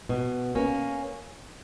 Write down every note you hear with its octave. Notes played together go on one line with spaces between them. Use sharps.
B2
A#3 C#4